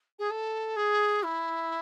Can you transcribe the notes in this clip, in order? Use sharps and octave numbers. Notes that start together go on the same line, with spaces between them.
G#4
A4
G#4
E4